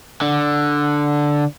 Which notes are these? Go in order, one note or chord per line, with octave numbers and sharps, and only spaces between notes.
D3